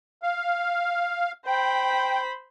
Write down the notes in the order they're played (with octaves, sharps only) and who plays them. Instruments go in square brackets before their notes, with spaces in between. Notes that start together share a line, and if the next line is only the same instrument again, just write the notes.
[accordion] F5
[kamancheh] C5 B5 [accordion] G5